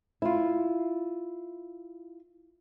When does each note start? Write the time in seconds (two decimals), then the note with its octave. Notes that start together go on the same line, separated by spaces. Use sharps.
0.22 E4 F4